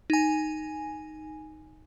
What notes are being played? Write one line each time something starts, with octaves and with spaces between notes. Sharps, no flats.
D#4 G#5